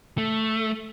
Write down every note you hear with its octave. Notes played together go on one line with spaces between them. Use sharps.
A3